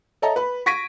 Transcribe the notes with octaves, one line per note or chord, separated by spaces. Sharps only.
A4 C#5 D#5 E5 A5 A#5
B4 B5
C#6 G#6 A#6 B6 D7 D#7